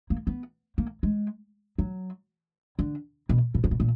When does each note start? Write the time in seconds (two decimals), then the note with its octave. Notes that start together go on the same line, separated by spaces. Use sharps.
0.10 A#3
0.27 B3
0.78 A#3
1.03 G#3
1.78 F#3
2.79 D3
3.29 B2
3.55 B2
3.64 D3
3.71 B2
3.80 A#2